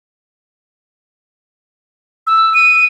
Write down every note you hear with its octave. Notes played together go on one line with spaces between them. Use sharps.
E6
D#7